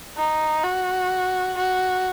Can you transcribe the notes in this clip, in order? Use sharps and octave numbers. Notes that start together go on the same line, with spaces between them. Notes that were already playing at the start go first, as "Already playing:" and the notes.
D#4
F#4
F#4